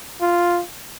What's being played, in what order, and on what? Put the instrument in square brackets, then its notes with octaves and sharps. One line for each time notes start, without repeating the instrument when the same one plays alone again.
[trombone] F4